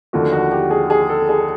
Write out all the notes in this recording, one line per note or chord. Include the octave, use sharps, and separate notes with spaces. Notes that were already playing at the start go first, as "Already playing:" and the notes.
D#2 D3 F3 A3 F#4
F#4
G4
G#4
G#4
A4
G#4